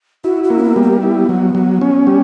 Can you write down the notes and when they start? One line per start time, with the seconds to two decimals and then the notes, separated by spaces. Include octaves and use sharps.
0.24 E4 F#4
0.44 F#4
0.50 A#3
0.58 C#4
0.63 B3
0.76 G3
0.83 B3
1.03 E4
1.29 F#3
1.55 F#3
1.81 C#4
2.07 G3